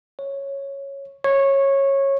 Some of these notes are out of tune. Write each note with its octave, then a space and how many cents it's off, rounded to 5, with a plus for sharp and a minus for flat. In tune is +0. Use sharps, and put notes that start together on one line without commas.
C#5 -5
C#5 -15